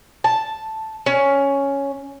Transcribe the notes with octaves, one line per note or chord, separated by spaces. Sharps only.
A5
C#4